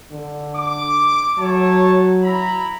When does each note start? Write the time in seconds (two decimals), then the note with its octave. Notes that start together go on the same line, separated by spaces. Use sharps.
0.12 D3
0.56 D6
1.39 F#3 A3 C#5 A5
2.22 E4 A#5 B5